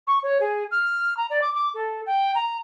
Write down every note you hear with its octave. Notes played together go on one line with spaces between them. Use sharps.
C#6
C#5
G#4
F6
A#5
D5
D6
D6
A4
G5
A#5